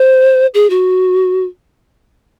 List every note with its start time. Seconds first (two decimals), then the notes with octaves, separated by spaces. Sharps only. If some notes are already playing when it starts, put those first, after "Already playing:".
Already playing: C5
0.54 G#4
0.70 F#4